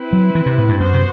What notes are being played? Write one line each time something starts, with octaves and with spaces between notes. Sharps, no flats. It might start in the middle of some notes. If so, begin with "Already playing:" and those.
Already playing: C4 E4 B4
F#3
E3
C3
A2
G2
F#2 B3 F#4 C5
C3